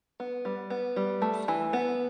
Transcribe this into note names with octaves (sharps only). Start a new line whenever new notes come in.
B3
G3
B3
G3
A3
E3
B3